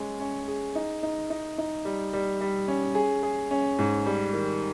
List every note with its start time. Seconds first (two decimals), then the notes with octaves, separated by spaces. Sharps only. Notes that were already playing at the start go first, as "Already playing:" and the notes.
Already playing: G#3 C#4
0.20 C#4
0.48 G#4
0.75 D#4
1.03 D#4
1.30 D#4
1.58 D#4
1.85 G3
2.13 G3
2.41 G3
2.68 C#4
2.95 G#4
3.23 G#4
3.51 C#4
3.79 G#2
4.06 G3
4.33 D#3